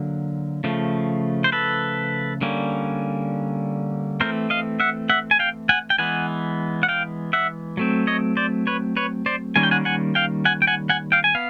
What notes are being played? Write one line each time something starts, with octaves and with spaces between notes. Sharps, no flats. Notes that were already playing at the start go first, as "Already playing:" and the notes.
Already playing: D3 F#3 A#3
C#3 F3 A3
C5
A4 B4
D3 G3 A#3 C#4
E3 A3 C4 A#4 C5
D#5 F5
E5 F#5
E5 F#5
G#5
F5 G5
F#5 G#5
G5
E3 G#3 B3 F#5 G#5
F#5
F5 G5
E5 F#5
F#3 A3 C4
C#5 D#5
C5 D5
B4 C#5
B4 C#5
C5 D5
D#3 G3 A#3 C#4 G#5
G5
F#5 G#5
F#5 G#5
F5 G5
F#5 G#5
G5
F#5 G#5
F#5 G#5
F5 G5
G#5
B3 F5